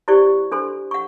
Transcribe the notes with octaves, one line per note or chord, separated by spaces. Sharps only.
E4 G4 C5 D5 C#6
D4 A4 C5 C6
F#5 C#6